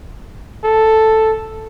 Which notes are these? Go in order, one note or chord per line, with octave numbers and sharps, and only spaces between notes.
A4